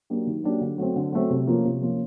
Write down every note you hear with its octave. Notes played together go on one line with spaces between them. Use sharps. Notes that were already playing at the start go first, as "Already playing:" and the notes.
F#3 A#3 D4 G4
D#3
F#3 A#3 D4 G4
D3
F#3 A3 C4
D3
F#3 A3 C4
C3
F3 A#3 C#4 F4
C3
F3 A#3 C#4 F4